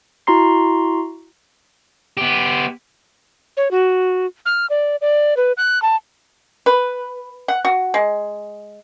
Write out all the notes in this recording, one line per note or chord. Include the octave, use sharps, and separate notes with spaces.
E4 F#4 A#5 C6 C7
B3 G4
C#5
F#4
F6
D5
D5
B4
F#6
A5
B4
F#5
F#4
G#3